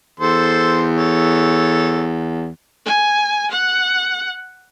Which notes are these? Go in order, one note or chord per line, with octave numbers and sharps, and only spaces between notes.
E2 A4 C5 C6
A4 C#5
G#5
F#5